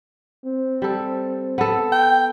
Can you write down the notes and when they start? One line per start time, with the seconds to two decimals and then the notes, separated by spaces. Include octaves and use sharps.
0.46 C4
0.82 G3 A4
1.58 B3 A4
1.92 G5